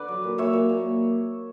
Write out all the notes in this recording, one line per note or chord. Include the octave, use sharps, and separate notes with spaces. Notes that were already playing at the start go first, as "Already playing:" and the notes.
Already playing: D3 B4 D5
F#3
A#2
A#2 C#5 E5
A#2
A#2